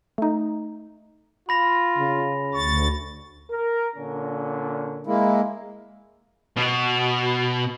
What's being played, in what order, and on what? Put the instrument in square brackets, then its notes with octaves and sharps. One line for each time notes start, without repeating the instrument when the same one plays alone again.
[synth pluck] A3 D#4
[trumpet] F4 [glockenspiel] B5 A#6 F7
[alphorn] C#3
[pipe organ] D2 A6 [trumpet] C#6
[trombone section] A#4
A#2 D3 C#4
[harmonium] G#3 A#3 E4
[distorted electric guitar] B2